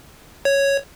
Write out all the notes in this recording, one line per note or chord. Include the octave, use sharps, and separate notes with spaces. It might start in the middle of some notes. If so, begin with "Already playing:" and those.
C#5